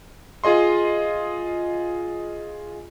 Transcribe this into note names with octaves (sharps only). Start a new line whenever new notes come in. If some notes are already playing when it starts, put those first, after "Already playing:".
F4 G#4 D#5 C6